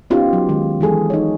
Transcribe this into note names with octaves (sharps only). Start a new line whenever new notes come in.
B3 C#4 D#4 F4 G4
F#3
D#3 G#3
E3 G#3 G#4 A4
D#4 C#5